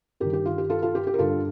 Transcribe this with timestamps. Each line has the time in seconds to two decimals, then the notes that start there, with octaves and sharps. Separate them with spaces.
0.20 G2 D#3 G4 A#4
0.33 G4
0.45 F4
0.58 G4
0.70 F4 A4
0.82 F4 A4
0.95 G4
1.07 G4
1.14 A#4
1.18 G2 D3 F4 A4